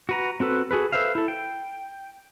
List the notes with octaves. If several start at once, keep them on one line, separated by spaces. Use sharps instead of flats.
F#4 B4 A#5
C4 F#4 A4 B4
F#4 G#4 A4 B4
A4 B4 C5 E5 F5
E4 A4
G5